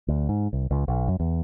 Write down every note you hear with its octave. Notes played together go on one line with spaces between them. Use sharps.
D2
G#2
C2
C#2
B1
F#2
E2